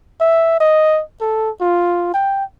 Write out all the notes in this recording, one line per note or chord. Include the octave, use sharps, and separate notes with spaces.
E5
D#5
A4
F4
G5